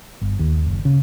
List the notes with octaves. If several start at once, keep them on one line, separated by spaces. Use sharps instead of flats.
G1
D#2
F#1
C#3